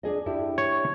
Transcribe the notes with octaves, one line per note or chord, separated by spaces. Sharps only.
D4 G#4 D#5
D4 E4 G4
C#5